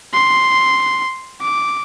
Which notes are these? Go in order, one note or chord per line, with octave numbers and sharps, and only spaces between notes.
C6
D6